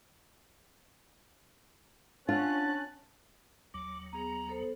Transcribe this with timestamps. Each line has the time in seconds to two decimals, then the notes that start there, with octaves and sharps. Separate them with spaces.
2.29 C#4 D4 F4 F#5 A5 F#6
3.74 D#2 F#3 D6
4.13 B3 G#4 A#5
4.47 B3 A4 C5